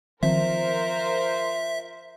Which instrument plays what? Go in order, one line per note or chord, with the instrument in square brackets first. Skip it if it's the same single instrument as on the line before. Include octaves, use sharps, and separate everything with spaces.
[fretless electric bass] D#3 F3 C4 [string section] F4 A#4 C5 [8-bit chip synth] E5